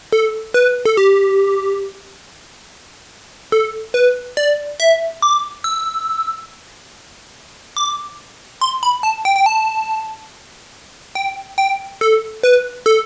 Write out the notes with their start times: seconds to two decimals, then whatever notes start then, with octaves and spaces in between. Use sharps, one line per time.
0.12 A4
0.54 B4
0.85 A4
0.97 G4
3.52 A4
3.94 B4
4.37 D5
4.80 E5
5.22 D6
5.64 E6
7.77 D6
8.61 C6
8.83 B5
9.03 A5
9.25 G5
9.36 G5
9.46 A5
11.15 G5
11.58 G5
12.01 A4
12.43 B4
12.86 A4